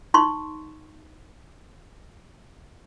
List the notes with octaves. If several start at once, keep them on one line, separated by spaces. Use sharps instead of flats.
D#4 C6 C#6